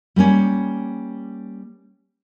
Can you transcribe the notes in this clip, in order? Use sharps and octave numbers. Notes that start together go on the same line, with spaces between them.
G3 A#3 C4 C#4